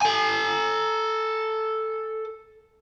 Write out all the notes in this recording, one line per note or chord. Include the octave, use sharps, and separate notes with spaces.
A4 G#5